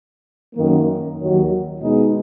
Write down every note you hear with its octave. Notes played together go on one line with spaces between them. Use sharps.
F#2 D#3 A#3
D#2 D#3 F#3
B2 G#3 D#4